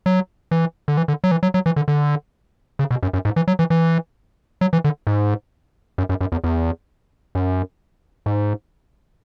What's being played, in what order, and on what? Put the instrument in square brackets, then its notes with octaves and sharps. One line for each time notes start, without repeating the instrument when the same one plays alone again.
[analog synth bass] F#3
E3
D3
E3
D3
F#3
E3
F#3
F#3
E3
D3
D3
C#3
B2
F#2
F#2
G#2
E3
F#3
E3
E3
F#3
E3
D3
G#2
F#2
F#2
F#2
E2
E2
F#2
G#2